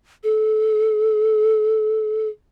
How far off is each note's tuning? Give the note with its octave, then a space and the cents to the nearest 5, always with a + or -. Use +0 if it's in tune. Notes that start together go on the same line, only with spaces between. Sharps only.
A4 -25